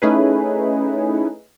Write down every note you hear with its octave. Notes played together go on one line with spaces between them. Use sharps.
A3 C#4 D#4 E4 G#4 B4